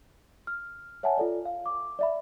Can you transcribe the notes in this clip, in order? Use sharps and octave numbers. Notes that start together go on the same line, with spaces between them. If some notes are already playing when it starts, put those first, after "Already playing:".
F6
C#5 E5 F#5 G#5 A5
F4 A4 D5
F5
D6
D5 E5 B5